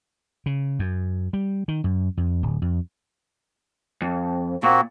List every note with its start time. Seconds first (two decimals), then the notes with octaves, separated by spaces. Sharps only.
0.46 C#3
0.79 F#2
1.33 G3
1.68 D#3
1.84 F#2
2.17 F2
2.43 D1
2.62 F2
4.01 F2
4.63 A#2 A#3 C4 F#4